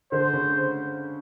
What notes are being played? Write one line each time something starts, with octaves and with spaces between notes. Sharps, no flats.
D3 C5
C#3